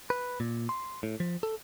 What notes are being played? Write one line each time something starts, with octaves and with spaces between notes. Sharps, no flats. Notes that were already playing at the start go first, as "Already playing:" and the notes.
B4
A#2
C6
A2
F3
A4